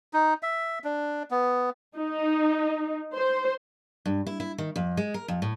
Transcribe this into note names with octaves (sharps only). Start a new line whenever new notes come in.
D#4
E5
D4
B3
D#4
C5
G2
E4
E4
D#3
F2
G#3
A#4
F2
A2